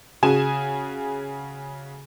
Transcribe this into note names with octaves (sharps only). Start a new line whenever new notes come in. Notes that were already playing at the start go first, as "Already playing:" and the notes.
C#3 F#4 G#4 G#5 E7